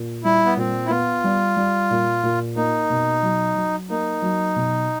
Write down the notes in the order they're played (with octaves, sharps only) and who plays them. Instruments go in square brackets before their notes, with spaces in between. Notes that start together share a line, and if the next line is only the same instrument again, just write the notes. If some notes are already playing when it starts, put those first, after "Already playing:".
Already playing: [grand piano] A#2
[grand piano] G3 [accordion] E4
[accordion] B3
[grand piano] A#2 [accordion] C4
[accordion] E4
[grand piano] B3 [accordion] F4
[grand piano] G3
G3
A#2
A#2
[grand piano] A#3 [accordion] D#4
[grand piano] B2
F#3
F#3
[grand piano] A#3 [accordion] D#4
[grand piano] F#3
B2